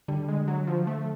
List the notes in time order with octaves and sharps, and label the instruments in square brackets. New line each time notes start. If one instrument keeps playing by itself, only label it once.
[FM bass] D3 [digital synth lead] G3
[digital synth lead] G#3
F#3
F3
A3